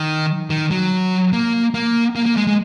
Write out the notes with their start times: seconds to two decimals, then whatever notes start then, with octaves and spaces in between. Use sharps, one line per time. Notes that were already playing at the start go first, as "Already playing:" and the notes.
Already playing: D#3
0.50 D#3
0.71 F#3
1.33 A#3
1.74 A#3
2.16 A#3
2.26 A#3
2.37 G#3
2.47 G#3